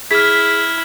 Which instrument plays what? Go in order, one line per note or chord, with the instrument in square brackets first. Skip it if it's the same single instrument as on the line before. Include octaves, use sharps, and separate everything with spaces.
[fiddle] E4 [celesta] G#4 B6 [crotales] F6 G#6